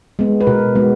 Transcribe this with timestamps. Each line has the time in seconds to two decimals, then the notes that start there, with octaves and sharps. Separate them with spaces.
0.19 G#3 B3
0.41 B4
0.47 B2 A#4
0.75 G#3 B3